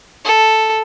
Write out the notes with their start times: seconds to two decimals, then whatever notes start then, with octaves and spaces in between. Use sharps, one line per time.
0.24 A4